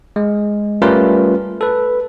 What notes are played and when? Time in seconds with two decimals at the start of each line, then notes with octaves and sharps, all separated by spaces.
0.16 G#3
0.82 G3 A3 C#4 F4 A#4 B4
1.61 A4 B4